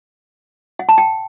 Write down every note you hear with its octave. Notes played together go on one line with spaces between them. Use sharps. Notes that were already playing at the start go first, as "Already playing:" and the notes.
F#5
A5
G5